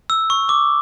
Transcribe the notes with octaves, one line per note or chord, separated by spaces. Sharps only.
E6
C#6
D6